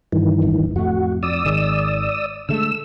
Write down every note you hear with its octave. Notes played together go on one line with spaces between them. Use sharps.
G2 D#3 E3
D1 G1
F2 A2 A3 F#4
F2 D5 D#6 E6
G#1 D#3 G#3
D3 G#3 A3 E6